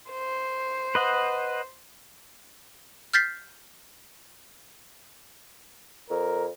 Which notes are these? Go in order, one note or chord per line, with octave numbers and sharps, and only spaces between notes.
C5
B4 D#5 F#5
F6 G6 A6 B6 C7
F2 A#4